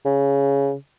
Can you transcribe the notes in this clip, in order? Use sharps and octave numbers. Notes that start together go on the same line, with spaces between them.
C#3